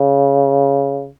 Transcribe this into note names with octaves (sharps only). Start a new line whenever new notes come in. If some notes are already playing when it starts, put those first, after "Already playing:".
Already playing: C#3